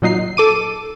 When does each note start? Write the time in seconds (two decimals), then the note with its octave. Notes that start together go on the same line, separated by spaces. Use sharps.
0.02 A#2 F#3 D#4 C7
0.37 A4 D6 D#7